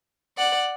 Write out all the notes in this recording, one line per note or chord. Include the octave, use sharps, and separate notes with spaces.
D5 F#5